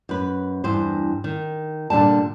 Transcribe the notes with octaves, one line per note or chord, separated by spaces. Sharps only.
F#2 B4
E2 G2 C4 C5
D#3
A#2 D3 G3 A5